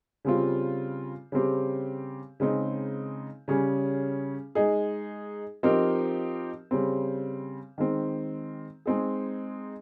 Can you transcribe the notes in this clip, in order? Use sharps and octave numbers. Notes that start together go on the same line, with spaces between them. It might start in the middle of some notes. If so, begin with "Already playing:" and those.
C#3 G3 C4 F4
C#3 G3 C4 G4
C#3 G#3 C4 D#4
C#3 G3 C#4 G#4
G#3 D#4 G#4
F3 C4 D#4 G4 A#4
C#3 G3 C4
D#3 G#3 C4
G#3 C4 D#4 G#4